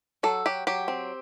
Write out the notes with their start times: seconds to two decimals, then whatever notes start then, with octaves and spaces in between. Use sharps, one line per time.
0.23 F#3 A4
0.46 F#3 G4
0.67 F#3 G4
0.88 C4